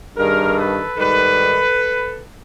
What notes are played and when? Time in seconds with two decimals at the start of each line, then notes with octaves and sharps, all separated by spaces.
0.17 G2 D#3 G3 G#4 A#4
0.57 A4 B4
0.96 G#2 D#3 G3 A4 B4